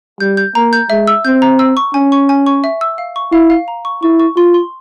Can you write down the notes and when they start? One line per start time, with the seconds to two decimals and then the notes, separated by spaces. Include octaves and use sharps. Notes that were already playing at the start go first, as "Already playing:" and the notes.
0.20 G3 G6
0.37 G6
0.55 A#3 A#5
0.73 G6
0.90 G#3 E5
1.07 E6
1.25 C4 G6
1.42 A#5
1.59 E6
1.77 C#6
1.94 C#4 G#5
2.12 C#6
2.29 G#5
2.46 C#6
2.64 E5
2.81 E6
2.98 F5
3.16 C#6
3.32 E4 F5
3.50 F5
3.68 A#5
3.85 C#6
4.03 E4 C#6
4.20 C#6
4.36 F4 C6
4.54 C6